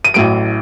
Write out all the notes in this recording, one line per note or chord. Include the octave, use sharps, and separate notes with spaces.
D#7
A1 A2 F#3 D7